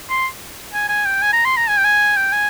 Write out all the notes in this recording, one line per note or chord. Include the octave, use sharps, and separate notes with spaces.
C6
G#5
G#5
G5
G#5
A#5
C6
A#5
G#5
G5
G#5
G5
G#5